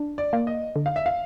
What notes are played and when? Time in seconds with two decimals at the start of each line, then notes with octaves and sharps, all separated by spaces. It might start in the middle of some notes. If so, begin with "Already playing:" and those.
Already playing: D4
0.18 D5
0.33 A#3
0.47 D#5
0.76 D3
0.86 F5
0.96 E5
1.06 F5